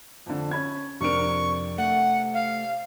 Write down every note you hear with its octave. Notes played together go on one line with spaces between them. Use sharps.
F2 D3
C#4 B5 G#6
F2 C3 D4 A#4 C#6 D7
A3 F#5
F5